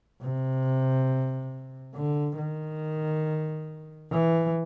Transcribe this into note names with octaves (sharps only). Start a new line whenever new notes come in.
C3
D3
D#3
E3